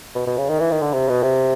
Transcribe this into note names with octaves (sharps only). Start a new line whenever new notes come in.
B2
B2
C#3
D#3
E3
D#3
D3
C3
B2
C3